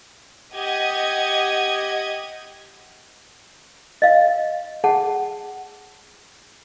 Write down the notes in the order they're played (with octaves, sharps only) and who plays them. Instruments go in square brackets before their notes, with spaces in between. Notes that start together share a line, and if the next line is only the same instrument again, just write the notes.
[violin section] G4 D#5 F#5 D#6 G#6
[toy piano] D#5 F5
G#4 F#5 A5